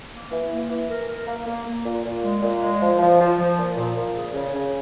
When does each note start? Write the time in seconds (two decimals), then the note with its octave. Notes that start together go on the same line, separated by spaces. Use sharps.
0.11 A#3
0.30 E3
0.50 A#3
0.69 E3
0.88 A#4
1.07 A#4
1.26 A#3
1.46 A#3
1.65 A#3
1.83 A#2
2.04 A#2
2.23 G#3
2.41 A#2
2.61 G#3
2.80 F3
2.99 F3
3.19 F3
3.37 F3
3.58 A#2
3.76 A#2
3.96 A#2
4.14 C#3
4.33 C#3
4.53 C#3